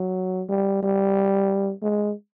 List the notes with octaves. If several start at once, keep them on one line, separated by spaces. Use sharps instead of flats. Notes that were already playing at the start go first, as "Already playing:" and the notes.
Already playing: F#3
G3
G3
G#3